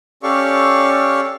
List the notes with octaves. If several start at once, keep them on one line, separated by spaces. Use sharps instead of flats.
C#4 G4 A4 D5 F5 C#6